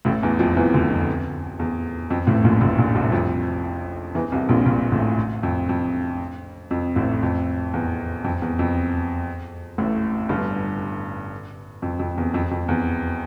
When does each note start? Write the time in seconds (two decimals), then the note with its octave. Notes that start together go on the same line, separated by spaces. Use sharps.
0.05 A1 A2
0.22 E2 E3
0.39 F2 F3
0.57 E2 E3
0.74 D2 D3
0.90 F2
1.59 E2
2.10 F2
2.27 A1 A2
2.44 A#1 A#2
2.61 A1 A2
2.78 A#1 A#2
2.95 C2 C3
3.12 F2 F3
4.15 E2 E3
4.32 C2 C3
4.49 A#1 A#2
4.66 A#1 A#2
4.92 A1 A2
5.43 F2
5.69 F2
6.71 F2
6.96 A1 A2
7.23 F2
7.74 E2
8.24 F2
8.42 E2
8.59 F2
9.78 A1 A2
10.29 G1 G2
11.82 F2
11.99 F2
12.18 E2
12.34 F2
12.51 F2
12.68 E2